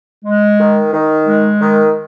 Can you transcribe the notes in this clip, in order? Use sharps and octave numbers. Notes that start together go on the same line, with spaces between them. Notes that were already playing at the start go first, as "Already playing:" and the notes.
G#3
D#3
D#3
G#3
D#3